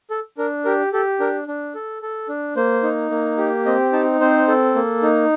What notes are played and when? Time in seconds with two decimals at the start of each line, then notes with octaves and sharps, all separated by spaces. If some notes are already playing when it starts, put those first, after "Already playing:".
0.11 A4
0.38 D4 A#4
0.65 G4 A#4
0.93 G4 A4
1.20 D4 A#4
1.48 D4
1.75 A4
2.02 A4
2.29 D4
2.56 A#3 C5
2.83 D#4
3.11 A#3
3.38 G4
3.66 C4 D#5
3.92 D#4 A5
4.21 C4 C5
4.48 A4
4.75 A#3
5.02 D#4